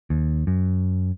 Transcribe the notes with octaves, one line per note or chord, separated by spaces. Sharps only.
D#2
F#2